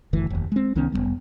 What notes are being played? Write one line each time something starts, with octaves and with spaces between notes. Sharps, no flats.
F#1 D2 E3
F1 D#2
G#3 C4
C2 D#3 B3 C#4
F1 F2 G3 B3